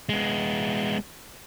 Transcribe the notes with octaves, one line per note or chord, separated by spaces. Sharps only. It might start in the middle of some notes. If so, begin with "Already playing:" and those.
G#3 B3